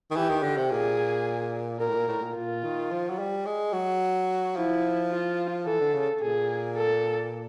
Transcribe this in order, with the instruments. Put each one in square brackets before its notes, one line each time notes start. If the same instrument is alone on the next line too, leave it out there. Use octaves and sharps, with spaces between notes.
[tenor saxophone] D#3
[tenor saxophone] E3 [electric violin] G4
[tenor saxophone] D#3
D3
C3
[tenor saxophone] A#2 [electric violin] G#4
[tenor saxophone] A#2 [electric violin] A#4
[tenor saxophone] A2
A#2
A2
A#2
[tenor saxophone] A#2 [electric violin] F4
[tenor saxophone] D#3
F3
F#3
G3
G#3
F#3
[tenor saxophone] F3 [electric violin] E4
[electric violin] F4
[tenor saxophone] E3 [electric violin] A4
[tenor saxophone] D3
C#3
[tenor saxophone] A#2 [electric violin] G#4
[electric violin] A4